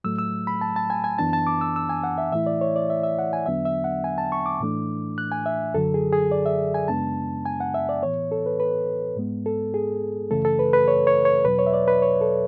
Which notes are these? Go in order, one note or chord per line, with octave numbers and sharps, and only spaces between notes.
A2 F#3 A3 E6
E6
B5
A5
A5
G#5
G#5
F#2 E3 B3 D4 A5
A5
D6
E6
E6
G#5
F#5
E5
A2 E3 A3 E4 E5
D5
C#5
D5
E5
E5
F#5
G#5
E2 D3 F#3 B3 D4 E5
E5
F#5
G#5
A5
C#6
D6
A2 E3 A3 D4
F#6
G#5
E5
F#2 D3 F#3 A4
G#4
G#4
D5
E5
G#5
F#2 C#3 G#3 B3 D4 A5
G#5
F#5
E5
D5
A2 E3 B3 C#5
A4
B4
B4
G#2 G#3 B3
A4
G#4
F#2 C#3 E3 A3 A4
A4
B4
B4
C#5
C#5
C#5
E2 B2 F#3 B4
C#5
E5
D5
B4
C#5
A4